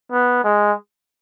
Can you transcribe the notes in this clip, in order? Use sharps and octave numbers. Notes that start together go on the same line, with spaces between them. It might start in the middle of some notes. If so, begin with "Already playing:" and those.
B3
G#3